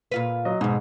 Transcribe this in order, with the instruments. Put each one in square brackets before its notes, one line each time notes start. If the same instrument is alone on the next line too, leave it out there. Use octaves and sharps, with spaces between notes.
[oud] A#2 F4 B4
[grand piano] F#3 D#5
[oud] F2 B2 [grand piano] G#2